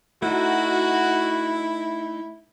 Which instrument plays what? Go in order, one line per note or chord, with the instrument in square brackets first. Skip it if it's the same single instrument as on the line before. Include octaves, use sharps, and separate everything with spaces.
[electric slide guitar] A3 D#4 [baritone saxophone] E4 [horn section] F#4